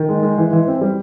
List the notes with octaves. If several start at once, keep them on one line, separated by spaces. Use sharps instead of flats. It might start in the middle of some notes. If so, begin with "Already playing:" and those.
Already playing: D#3
G#3
G#3
E3
E3
C4
G3